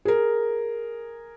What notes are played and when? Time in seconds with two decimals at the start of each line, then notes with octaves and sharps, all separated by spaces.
0.05 G#4 A#4